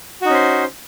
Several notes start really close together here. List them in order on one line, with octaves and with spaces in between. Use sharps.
F#4 D#4 C#4 C5